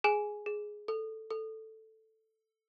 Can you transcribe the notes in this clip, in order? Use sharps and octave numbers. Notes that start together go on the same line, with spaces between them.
G#4 G#5
G#4
A4
A4